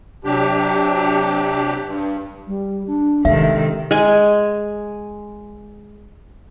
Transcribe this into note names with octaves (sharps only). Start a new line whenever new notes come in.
C3 F#3 D4 G4
G2
G3
D4
C3 D#3 G#3 D4 A4 E5
G#3 G#5